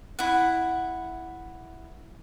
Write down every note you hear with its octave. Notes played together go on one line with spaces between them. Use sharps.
E4 F#5